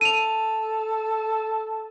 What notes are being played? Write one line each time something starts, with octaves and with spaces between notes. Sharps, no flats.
A4 D#7 F7